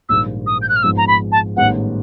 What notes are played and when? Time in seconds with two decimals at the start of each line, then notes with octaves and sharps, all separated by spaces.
0.09 A#1 G#2 D#3 G3 A#3 E6
0.47 D#6
0.62 G6
0.69 F#6
0.76 F6
0.83 G#1 G#2 F3 G#3 B3 E6
0.98 A#5
1.07 B5
1.32 A5
1.57 A1 G#2 D#3 G3 B3 F#5